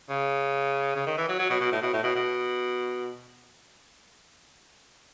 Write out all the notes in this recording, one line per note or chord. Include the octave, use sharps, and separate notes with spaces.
C#3
C#3
D#3
E3
F#3
F#3
B2
B2
A2
B2
A2
B2
B2